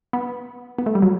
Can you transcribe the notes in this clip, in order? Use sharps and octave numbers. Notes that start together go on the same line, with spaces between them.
B3
B3
A3
G3
F#3